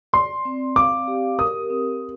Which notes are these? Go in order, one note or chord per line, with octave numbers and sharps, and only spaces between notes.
D5 C6
C4
F5 D6
G4
A#4 D#6
C4